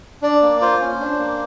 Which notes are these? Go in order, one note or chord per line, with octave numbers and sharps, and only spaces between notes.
D4 D5
A#3
F4 C5
C#4
D4
A#3